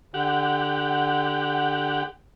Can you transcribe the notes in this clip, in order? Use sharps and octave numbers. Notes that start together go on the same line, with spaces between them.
D3 G4 F#5